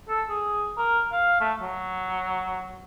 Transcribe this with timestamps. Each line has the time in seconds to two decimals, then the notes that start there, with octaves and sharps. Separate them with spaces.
0.09 A4
0.29 G#4
0.78 A#4
1.12 F5
1.40 A3
1.62 F#3